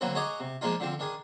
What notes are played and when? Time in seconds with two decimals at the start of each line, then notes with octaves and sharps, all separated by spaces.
0.01 D3 F#3 A#3 C4 B4
0.15 F#4 G#4 C#5 D#5 A#5 D6
0.40 C3
0.61 F3 G#3 A#3 D4 D#4 F4
0.80 D3 F3 C4
0.99 D#3 D4 G#4